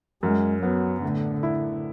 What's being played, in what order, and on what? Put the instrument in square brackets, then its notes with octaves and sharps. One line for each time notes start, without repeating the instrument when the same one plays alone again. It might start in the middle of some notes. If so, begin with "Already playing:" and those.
[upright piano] F#2 [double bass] G#3
[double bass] F#3 [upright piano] B3
[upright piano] A2 [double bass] D3
[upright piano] E4